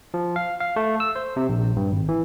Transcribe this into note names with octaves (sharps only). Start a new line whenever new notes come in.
F3
F5
F5
A3
E6
C5
C3
A#1
G2
G#1
E3